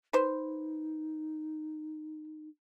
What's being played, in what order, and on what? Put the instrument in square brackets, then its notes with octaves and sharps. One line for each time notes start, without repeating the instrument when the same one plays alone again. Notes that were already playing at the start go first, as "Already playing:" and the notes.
[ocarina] D#4 [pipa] B4 C5